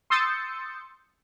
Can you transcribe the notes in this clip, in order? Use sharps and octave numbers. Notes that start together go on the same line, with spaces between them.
C6 D#6 E6 G6 A6 C#7